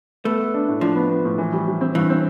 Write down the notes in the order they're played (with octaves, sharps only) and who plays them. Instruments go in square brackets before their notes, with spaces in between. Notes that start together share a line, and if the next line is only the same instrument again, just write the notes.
[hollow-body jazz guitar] A3 [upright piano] B3
[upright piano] B3
D4
A2
[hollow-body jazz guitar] F3 [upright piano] D4
[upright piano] B3
B3
A2
E3
G3
G3
C4
[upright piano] G2 [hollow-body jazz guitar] E3
[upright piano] C4